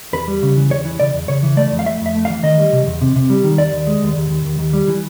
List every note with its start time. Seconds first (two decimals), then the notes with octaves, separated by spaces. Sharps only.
0.13 E2 B4
0.28 G3
0.42 C#3
0.57 E3
0.71 E2 C#5
0.85 E3
1.00 C#3 D5
1.14 E2
1.28 C#3 C#5
1.43 E3
1.57 A3 D5
1.71 F2
1.79 F5
1.86 A3 E5
2.01 F2
2.06 E5
2.15 A3
2.25 F5
2.30 E3
2.43 D#3 D#5
2.58 G3
2.73 C3
2.87 E2
3.01 C3
3.16 C3
3.30 G3
3.44 D#3
3.58 D#2 D5
3.72 D#2
3.87 G#3
4.02 D#2
4.17 D#2
4.30 D#2
4.45 D#2
4.59 D#2
4.73 G3
4.88 E3